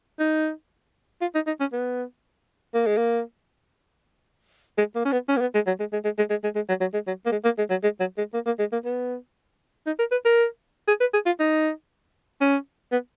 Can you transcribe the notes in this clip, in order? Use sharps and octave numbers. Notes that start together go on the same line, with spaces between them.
D#4
F4
D#4
D#4
C#4
B3
A#3
G#3
A#3
G#3
A#3
C#4
B3
C#4
A#3
B3
G#3
F#3
G#3
G#3
G#3
G#3
G#3
G#3
G#3
F#3
F#3
G#3
F#3
A#3
G#3
A#3
G#3
F#3
G#3
F#3
G#3
A#3
A#3
G#3
A#3
B3
D#4
A#4
B4
A#4
G#4
B4
G#4
F4
D#4
C#4
B3